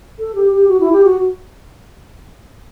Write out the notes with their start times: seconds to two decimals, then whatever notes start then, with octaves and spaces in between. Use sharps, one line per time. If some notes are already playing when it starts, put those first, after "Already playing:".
0.19 A4
0.35 G4
0.52 G4
0.68 F#4
0.80 E4
0.92 G4
1.04 F#4